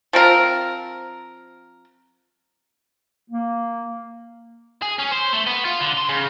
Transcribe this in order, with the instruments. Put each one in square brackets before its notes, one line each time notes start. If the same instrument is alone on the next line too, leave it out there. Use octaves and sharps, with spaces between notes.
[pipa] F3 C4 A#4
[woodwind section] A#3
[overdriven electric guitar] G#4
C#4
C5
A3
B3
F4
D3
C6
C#3